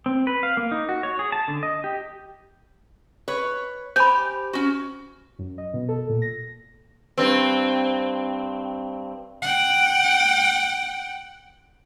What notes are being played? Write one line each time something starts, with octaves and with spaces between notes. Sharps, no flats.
C4
B4
F5
A#3
D#4
F#4
C#5
G#4
A5
D3
D#5
G4
B4 C#5
G4 C5 G#5 B5 G6
C#4 F#4
F#2
D#5
B2
A4
A#2
A#6
G2 C4
F#5 G5